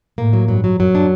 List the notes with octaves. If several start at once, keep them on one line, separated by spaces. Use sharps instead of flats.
A2 A#3
F#3
G2 F#3
F#3
F#2 F#3
D4